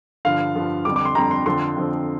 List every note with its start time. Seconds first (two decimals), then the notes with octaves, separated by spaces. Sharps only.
0.25 G2 D3 F3 F5
0.56 G2 D3 F3
0.85 F2 D3 G3 D6
0.96 D6
1.05 C6
1.15 F2 D3 G3 A#5
1.31 C6
1.46 F2 D3 F3 C4 C6
1.76 F2 D3 F3 C4